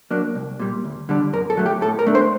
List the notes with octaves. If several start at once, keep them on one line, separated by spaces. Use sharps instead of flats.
F#3 A#3 D4
C2
A#2 G3
D2
D3 G3 D4
F#2 A#4
A4
F#3 A3
G4
A2 A4
A#4
A3 D4
C5